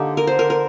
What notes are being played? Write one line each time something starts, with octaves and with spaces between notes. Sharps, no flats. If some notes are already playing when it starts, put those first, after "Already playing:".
Already playing: D3 A#3 D#4 G4
A#4
C5
A#4
A#4